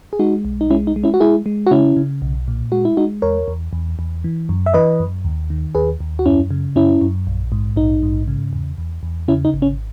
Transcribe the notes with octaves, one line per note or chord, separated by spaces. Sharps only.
G#4
G#3 D#4 F#4
B1
D#4
G#3 C#4 E4
D#4
G#3
C#4 E4
F#4
G#3 E4 G#4
G#3
F#4
C#3 C#4 E4
C#3
B1
A#2
G#3 F#4
E4
G#3 D#4 F#4
E2 A#4 C#5
E2
E2
E2
E3
F#2
E5
E3 B4 D#5
F#2
D#2
D#3
D#2 G#4 B4
D#2
F#4
F#2 C#4 E4
C#3
F#2 C#4 E4
F#2
A#1
G#2
A#1 D#4
G#2
C#3
E2
E2
E2
C#3 C#4 E4
D#4
G#1
C#4